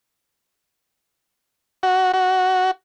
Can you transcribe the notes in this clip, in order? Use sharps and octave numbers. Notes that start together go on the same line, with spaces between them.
F#4
F#4